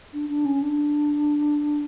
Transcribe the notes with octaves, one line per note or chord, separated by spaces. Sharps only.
D4
D4
C#4
D4